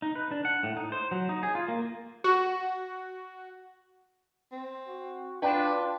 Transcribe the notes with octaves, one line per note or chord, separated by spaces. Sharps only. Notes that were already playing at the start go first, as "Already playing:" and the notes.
D#4
B4
D4
F#5
A2
D#4
C5
F#3
D#4
G#4
F4
A#3
F#4
C4
F#4
D4 F4 B4 G5